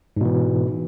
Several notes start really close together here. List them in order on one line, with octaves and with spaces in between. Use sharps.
G#2 B2 E3